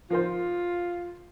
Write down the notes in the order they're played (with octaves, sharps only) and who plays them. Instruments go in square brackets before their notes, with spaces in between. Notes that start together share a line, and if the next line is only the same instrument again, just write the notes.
[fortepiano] F3 A#4 C5 [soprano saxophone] F4